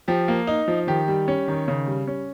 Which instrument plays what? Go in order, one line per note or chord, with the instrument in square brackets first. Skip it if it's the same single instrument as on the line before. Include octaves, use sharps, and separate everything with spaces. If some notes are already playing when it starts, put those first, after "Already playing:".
[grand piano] F3 G4
A#3
D#4
F3
D#3 G4
G3
C#4
D#3
C#3
G3
C#4